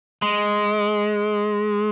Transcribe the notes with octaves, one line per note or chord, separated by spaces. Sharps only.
G#3